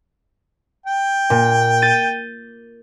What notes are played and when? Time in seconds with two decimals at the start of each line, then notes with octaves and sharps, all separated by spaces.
0.86 G5
1.30 A#2
1.82 G6 A6 D#7